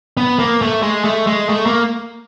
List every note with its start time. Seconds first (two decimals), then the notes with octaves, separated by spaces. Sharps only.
0.17 B3
0.39 A#3
0.62 A3
0.82 G#3
1.04 A3
1.27 G#3
1.49 A3
1.66 A#3